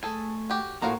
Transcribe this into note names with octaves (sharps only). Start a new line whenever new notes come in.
A3 G#4 A4 G#5
F#4 G4
A2 A3 A#3 F4 F#4 F5 A#5